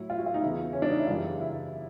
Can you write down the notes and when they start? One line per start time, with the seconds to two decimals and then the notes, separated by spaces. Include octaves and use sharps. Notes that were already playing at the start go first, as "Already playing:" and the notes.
Already playing: A2 F#3 E4
0.10 F4
0.18 F#4
0.26 F4
0.34 D#4
0.42 E2 C#3 E3 E4
0.73 C#4
0.82 D4
0.90 D#4
0.99 E4
1.07 F#2 C#3 E3 G3 F4
1.40 E4